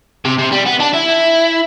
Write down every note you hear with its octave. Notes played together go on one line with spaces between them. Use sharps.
C3
C3
G3
B3
D4
E4